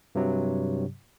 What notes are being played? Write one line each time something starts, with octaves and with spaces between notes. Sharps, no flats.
G2 C3 F#3